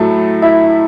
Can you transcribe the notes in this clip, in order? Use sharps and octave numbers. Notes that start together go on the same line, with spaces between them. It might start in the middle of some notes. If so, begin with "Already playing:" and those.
Already playing: A2 F#3 A3 A4
E4 E5